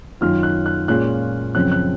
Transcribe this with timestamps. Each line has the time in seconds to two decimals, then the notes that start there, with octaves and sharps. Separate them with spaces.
0.21 F#2 D#3 F#3 C#4 F4 F6
0.43 F#6
0.66 F#6
0.88 A#2 G#3 C#4 F4 F#6
1.55 F#2 C#3 F3 C4 F#6
1.72 F#6